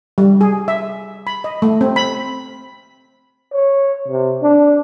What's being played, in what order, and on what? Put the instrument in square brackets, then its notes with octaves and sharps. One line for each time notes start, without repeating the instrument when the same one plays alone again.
[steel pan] G3
G#4
E5
B5
D#5
A3
C4
B5
[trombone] C#5
C3
D4